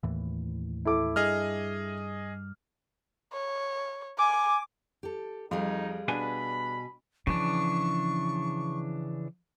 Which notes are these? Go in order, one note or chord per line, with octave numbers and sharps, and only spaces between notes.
D#2 A2 E3
E4 A4 D6
G2 G#4 D#5 F6
C#5
G#5 D6
G4 A4
F2 G3 D#4 G#4 F5
B2 D4 B4 G#5 B5
C#3 E3 F3 D4 C#6